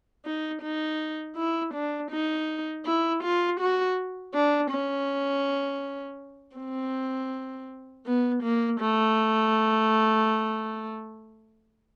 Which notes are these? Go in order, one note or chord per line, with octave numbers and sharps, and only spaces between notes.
D#4
D#4
E4
D4
D#4
E4
F4
F#4
D4
C#4
C4
B3
A#3
A3